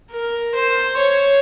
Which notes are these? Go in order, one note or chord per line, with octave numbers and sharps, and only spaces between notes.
A#4
C5
C#5